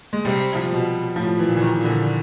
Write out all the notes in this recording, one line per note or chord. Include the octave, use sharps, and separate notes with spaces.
G#3
C3 G3
F3
B2
A2 F3
E3
A#2
E3
D#3
A#2
D3